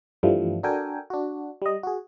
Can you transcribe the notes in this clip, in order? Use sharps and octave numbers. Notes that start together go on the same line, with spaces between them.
G2 E3 F3 G3 A3
D4 F#4 A4 A#4 G5 G#5
D4 F#4
G3 D#5
F#4 G#4